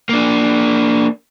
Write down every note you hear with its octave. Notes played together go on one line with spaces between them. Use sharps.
A#3 D4